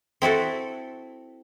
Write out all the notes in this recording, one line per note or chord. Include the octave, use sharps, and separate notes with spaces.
C4 E4 F#4 A4